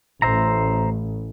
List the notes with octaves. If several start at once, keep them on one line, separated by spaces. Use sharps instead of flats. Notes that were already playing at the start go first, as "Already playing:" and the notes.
A1 C5 E5 A#5